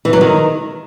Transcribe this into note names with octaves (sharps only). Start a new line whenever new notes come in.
E3
F#3
D#3